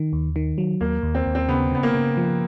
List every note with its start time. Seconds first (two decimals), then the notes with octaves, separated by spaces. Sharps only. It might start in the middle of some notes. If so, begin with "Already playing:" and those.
Already playing: D#3
0.13 D#2
0.36 D#3
0.58 F#3
0.81 D#2 A#3
1.03 D#2
1.15 C4
1.26 D#2
1.35 C4
1.49 C#3 B3
1.71 C#3 B3
1.83 A#3
1.94 C#3
2.17 F3